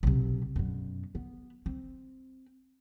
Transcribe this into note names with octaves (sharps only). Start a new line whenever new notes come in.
B1 C3
F#2 B2
B3
C4